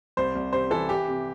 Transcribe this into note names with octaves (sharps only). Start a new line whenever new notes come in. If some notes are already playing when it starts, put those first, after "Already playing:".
C2 C5
C2
C3 C5
E3 A4
E3 G4
C3